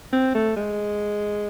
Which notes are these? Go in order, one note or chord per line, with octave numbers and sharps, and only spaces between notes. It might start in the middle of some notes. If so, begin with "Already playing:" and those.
C4
A3
G#3